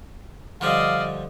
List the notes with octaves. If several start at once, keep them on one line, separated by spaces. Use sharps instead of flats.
D3 F3 G3 D5 D#5 F5